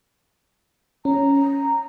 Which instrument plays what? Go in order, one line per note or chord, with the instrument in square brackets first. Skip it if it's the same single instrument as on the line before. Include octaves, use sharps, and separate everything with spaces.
[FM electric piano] C#4 [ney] A#5